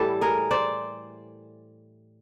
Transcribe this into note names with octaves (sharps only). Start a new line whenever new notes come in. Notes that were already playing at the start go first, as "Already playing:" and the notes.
Already playing: A2 E3 G3 G4 A4
G#4 A#4
C5 D5